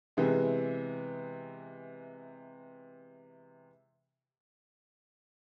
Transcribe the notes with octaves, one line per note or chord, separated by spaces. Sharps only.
C3 E3 G#3 B3